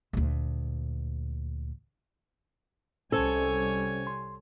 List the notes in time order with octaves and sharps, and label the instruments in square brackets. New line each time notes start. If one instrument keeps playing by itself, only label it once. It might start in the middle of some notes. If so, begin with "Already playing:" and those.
[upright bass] D2 A#2
[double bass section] C2 G3 [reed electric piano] C#4 C5 [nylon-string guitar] A4 [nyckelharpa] C#5 G#5
[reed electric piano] C6